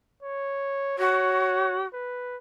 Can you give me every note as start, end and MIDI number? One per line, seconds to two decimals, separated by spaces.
0.23 0.98 73
0.98 1.86 66
0.98 1.81 73
1.94 2.37 71